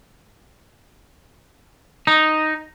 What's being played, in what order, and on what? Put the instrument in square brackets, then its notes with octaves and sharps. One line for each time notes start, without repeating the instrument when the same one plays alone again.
[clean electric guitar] D#4